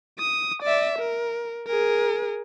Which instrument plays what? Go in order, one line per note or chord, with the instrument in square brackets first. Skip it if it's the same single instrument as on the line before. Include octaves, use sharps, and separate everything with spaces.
[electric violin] D#6
D5 E5
A#4
G#4 A#4